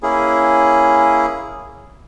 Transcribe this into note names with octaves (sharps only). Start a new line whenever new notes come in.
A#3 C#4 E4 G#4